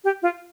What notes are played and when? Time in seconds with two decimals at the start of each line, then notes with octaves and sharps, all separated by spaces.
0.04 G4
0.22 F4